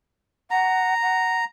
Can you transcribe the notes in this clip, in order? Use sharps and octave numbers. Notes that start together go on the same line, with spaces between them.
F#5 A#5
F#5